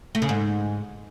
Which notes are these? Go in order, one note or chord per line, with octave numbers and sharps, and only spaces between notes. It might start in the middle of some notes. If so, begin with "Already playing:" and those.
A3
C#3
G#2